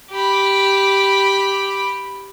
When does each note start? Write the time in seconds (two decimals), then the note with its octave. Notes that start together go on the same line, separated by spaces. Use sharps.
0.11 G4 B5